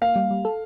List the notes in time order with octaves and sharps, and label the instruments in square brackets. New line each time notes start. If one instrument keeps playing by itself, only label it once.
[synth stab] A#3 [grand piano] F5
[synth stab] G3
G3
A4